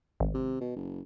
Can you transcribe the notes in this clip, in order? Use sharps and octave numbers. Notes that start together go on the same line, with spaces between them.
G#1
C3
B2
F#1